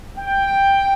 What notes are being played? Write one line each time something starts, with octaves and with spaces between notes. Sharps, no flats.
G5